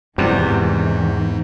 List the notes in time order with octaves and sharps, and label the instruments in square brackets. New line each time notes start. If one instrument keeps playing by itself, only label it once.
[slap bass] E2 [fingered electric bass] G#2 [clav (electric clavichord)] C3 G3 B3 [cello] D#3 E3